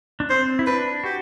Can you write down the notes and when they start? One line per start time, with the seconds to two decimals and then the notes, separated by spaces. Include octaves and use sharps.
0.20 D4
0.30 C4 C5
0.59 E4
0.67 D4 B4
1.04 F#4 G4